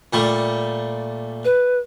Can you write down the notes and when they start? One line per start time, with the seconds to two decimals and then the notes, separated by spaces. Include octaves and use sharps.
0.13 A#2 G3 A3
1.45 B4